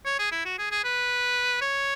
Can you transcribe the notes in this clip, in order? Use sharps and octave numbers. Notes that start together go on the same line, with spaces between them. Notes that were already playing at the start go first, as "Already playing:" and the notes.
C#5
G#4
E4
F#4
G#4
G#4
B4
C#5